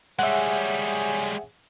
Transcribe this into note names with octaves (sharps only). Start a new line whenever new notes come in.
G3 G#3 G#4 C#5 E5 F#5